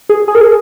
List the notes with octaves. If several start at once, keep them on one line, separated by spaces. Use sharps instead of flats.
G#4
G#4
A#4
G#4